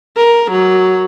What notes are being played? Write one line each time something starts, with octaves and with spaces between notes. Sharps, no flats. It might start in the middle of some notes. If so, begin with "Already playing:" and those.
A#4
F#3